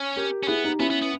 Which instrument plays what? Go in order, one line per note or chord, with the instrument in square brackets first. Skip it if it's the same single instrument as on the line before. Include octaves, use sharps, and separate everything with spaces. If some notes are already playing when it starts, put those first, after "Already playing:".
Already playing: [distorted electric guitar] C#4
[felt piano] G4 A#4
[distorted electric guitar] C#4
[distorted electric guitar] B3 [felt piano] E4 G#4
[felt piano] D#4 G4
[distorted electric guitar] B3 [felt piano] C#4 E4
[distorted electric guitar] B3
B3